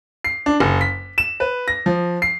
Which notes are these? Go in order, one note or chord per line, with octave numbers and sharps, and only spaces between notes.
C7
D4
F#1
B6
E7
B4
A#6
F3
C7